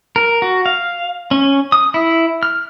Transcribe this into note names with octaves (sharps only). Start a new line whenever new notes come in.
A#4
F#4
F5
C#4
D#6
E4
F6